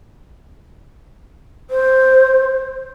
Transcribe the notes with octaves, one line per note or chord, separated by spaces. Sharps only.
C5